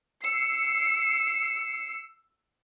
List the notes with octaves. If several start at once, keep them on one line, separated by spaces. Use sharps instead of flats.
E6 C7 C#7